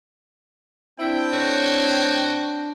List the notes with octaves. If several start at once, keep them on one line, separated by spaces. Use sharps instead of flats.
C4 D4 E4 G5
A2 F#4 C#5